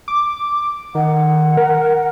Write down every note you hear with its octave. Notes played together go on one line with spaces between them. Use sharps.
D6
D#3 F#5
A#4